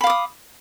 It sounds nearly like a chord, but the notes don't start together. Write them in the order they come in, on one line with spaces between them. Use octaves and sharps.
B5 F5 D6 D#6